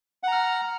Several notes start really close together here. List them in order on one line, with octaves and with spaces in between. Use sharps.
F#5 A#5 F6